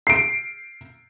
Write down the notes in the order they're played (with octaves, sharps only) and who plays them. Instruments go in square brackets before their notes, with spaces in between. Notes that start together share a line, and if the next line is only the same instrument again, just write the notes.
[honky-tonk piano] C7 D7